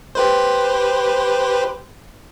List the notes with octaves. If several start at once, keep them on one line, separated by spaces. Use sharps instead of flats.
G4 B4 C5